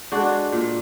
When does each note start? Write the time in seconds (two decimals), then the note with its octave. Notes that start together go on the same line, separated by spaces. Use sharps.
0.12 G#3 D4 F#4
0.52 A#2